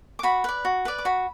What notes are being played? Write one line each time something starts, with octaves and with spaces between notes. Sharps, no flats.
D6
F#4 B5
B4 D5
F#4
B4 D5
D6
F#4 B5